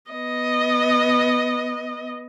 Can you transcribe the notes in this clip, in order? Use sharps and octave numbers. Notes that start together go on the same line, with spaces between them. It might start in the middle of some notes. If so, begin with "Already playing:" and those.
B3 D#5